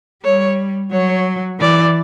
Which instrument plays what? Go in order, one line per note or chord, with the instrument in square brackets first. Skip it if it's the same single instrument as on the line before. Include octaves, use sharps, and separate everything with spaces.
[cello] G3 [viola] C#5
[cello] F#3 [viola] C#5
[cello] E3 [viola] D5